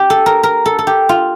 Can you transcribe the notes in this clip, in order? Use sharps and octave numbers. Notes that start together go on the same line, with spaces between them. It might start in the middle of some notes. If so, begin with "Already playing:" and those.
Already playing: G4
A4
A#4
A#4
A4
A4
G4
F4